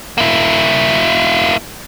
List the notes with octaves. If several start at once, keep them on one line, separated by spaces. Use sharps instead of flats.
A#3 E4